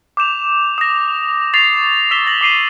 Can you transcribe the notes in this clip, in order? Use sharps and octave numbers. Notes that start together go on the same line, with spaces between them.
D6 G6 E7 F7
D#6 A#6
C#6 A6 C7 F7
E6 B6 C7 E7 G7
A6 A#6 F#7
D6 C7 D#7 F#7